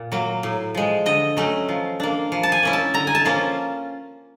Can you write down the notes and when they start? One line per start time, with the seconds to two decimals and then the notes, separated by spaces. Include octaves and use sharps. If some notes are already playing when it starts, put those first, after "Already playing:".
Already playing: A#2
0.12 F#3 A#3
0.43 A2
0.74 F3 G#3
1.06 D3 D#5
1.37 F#3 A3 C#4
1.69 F3
2.00 A#3 D4
2.32 F3
2.43 A5
2.52 G#5
2.63 A#3 C#4 E4
2.73 A5
2.94 D3 A#5
3.07 G#5
3.15 A5
3.25 F3 A#3 C#4 F4